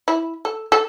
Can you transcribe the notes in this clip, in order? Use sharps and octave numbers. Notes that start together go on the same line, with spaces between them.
E4
A4
A4